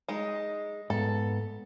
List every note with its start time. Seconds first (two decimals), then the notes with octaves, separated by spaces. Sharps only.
0.08 G#3 D#4
0.90 G#2 B3 A4